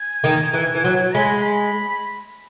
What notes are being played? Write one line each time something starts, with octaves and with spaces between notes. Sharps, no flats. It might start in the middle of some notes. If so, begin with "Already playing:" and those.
Already playing: G#5
D#3
E3
E3
F#3
G#3 B5
B5